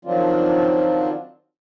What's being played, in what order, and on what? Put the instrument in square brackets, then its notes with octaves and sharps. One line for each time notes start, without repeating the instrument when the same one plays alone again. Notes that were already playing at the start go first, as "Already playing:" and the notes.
[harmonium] D#3 F3 F#3 C4 D4 F4